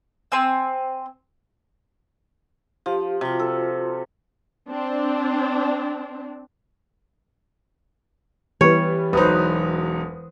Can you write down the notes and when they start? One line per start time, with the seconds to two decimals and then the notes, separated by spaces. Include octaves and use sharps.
0.32 C4 G#5 E6
2.86 F3 G4 F5
3.21 C3 F4 F#4
3.39 A4
4.69 C4 D4
8.61 E3 G3 B3 C#5
9.13 E1 F#3 D#4 B4 C5 D#6